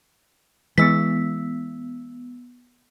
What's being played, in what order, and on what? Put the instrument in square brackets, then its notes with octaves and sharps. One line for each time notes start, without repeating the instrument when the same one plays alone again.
[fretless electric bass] E3 G#3 [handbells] B3 E6 B6